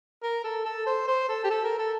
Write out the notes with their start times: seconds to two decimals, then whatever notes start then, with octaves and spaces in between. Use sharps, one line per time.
0.23 A#4
0.44 A4
0.65 A4
0.86 C5
1.07 C5
1.29 A4
1.44 G4
1.50 A4
1.64 A#4
1.78 A4